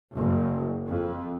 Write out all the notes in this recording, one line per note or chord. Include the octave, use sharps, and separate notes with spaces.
F#1
F2